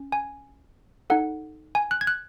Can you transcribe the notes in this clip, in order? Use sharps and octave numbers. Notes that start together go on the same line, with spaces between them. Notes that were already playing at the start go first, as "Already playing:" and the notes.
Already playing: C#4
G#5
D#4 A4 F#5
G#5
F#6
G#6
F#6